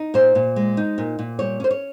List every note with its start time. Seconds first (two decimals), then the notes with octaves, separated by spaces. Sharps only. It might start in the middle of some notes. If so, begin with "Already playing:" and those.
Already playing: D#4
0.14 A#2 C5
0.35 A#2
0.56 G#3
0.77 D#4
0.98 A#2
1.19 A#2
1.39 G3 C#5
1.60 C#4 C5
1.71 C#5